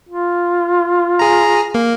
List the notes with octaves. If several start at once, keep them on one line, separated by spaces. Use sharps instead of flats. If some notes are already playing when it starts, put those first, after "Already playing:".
F4
G#4 A#5
A#3